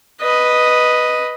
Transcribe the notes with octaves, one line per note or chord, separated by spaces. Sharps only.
B4 D#5